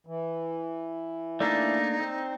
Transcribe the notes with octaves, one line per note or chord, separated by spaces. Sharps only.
E3
A3 A#3 D4 D#4 D5
C4